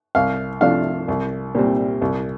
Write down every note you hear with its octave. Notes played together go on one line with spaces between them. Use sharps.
C2 F5
C3 F3 A3 D4 F5
C2
A#2 G3 C4
C2